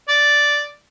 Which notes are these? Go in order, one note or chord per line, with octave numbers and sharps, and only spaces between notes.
D5